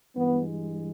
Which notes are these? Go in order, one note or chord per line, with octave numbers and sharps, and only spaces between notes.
G2 E3 G#3 B3